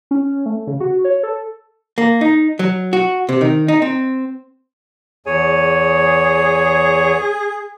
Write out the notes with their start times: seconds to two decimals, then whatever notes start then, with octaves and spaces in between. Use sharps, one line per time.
0.11 C#4
0.46 A3
0.67 C#3
0.80 F#4
1.05 C#5
1.23 A4
1.98 A#3
2.21 D#4
2.59 F#3
2.93 F#4
3.29 C3
3.41 D#3
3.68 D#4
3.82 C4
5.26 E2 G#4 C#5